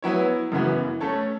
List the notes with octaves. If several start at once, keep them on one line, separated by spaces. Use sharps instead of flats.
F#3 B3 E4 C#5
F#2 C#3 E3 B3 F#4
A3 C#4 A4 C#5